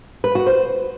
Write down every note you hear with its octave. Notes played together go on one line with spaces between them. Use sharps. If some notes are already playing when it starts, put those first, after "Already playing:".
B4
F#4
C5